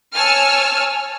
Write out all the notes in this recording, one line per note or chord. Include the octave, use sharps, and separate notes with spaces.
C#5 G#5 A5 E6 F6